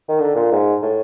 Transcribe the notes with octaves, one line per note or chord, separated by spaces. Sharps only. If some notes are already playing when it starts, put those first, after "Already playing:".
D#3
D3
A#2
G#2
A2